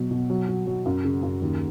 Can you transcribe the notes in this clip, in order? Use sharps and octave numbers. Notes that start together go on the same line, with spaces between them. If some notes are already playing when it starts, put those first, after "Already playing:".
Already playing: B2 F#3
B2
F#3
F#3
F#3
F#2
C#3
F#2
D#2